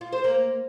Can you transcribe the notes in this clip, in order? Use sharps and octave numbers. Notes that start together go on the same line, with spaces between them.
F4
C5
A#3